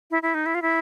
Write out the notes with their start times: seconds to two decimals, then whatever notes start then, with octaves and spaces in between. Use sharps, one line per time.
0.11 E4
0.23 E4
0.34 D#4
0.46 E4
0.55 F4
0.62 E4